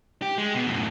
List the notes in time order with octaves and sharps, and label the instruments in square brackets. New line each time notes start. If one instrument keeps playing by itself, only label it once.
[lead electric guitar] G4
G#3
B2
F#2 A2